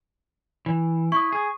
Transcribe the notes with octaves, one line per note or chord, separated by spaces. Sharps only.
E3
E4 C#6 D#6
G#4